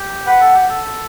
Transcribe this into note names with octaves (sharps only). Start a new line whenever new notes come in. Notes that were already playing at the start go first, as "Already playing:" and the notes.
Already playing: G4
B4 F#5
A4
G4
A4